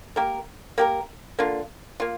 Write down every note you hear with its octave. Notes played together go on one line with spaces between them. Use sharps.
A#3 G4 A#4
A#3 G4 A#4
D3 A#3 F4
A#3 F4